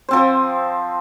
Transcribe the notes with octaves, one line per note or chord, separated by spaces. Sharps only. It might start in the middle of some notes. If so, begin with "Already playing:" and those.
F3 C4 C5